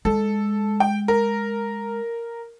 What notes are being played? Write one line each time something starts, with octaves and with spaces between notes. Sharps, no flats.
G#3 A4
G5
A#4